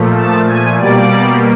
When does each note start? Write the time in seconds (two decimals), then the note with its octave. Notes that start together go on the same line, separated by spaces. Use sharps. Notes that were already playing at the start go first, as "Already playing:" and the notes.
Already playing: A#2 F3 A3
0.14 A5
0.46 G#5
0.78 B2 G3 A#3 D5